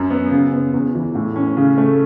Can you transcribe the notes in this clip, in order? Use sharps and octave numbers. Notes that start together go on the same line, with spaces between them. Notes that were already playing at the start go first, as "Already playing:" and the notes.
Already playing: F#2
B3
C#3
B3
E2
E3
A2
C#4
C#3
A3